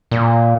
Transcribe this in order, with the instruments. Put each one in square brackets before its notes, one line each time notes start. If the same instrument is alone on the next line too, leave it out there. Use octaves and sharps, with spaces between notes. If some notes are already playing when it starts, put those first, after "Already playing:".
[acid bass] A#2